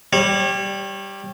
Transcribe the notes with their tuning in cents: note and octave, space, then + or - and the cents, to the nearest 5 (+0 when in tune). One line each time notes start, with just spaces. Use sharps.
G3 +0 C#5 -30